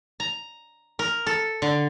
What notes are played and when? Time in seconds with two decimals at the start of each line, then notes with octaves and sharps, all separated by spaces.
0.20 A#5
0.99 A#4
1.27 A4
1.62 D3